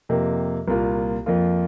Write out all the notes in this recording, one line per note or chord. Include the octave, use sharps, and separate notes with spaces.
F2 C3 A#3
C2 A#2 A#3 F4
F2 F3 A#3 F4